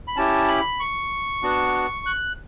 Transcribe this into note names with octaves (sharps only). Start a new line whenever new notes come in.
B5
C#4 E4 G4 A5
B5
C#6
B3 D4 F#4
F#6